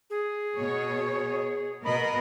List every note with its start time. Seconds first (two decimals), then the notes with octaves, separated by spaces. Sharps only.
0.10 G#4
0.57 B2 C#5
1.85 B2 A#4 D#5 B5